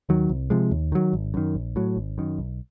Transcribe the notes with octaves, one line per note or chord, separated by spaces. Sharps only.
D#2 D#3 F#3
C2
C3 F3 G#3
D#2
D#3 F#3
G#1
F#2 D#3
A#1
A2 F#3
G#1
F#2 D#3
B1